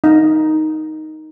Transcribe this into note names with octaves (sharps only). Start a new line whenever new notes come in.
D#4